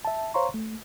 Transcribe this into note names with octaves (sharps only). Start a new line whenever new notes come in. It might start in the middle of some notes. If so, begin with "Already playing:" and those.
E5 A5
C5 C#5 F5 A#5 C6 C#6
A3